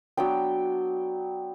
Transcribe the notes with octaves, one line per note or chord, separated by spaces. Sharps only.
F#3 B3 D4 G5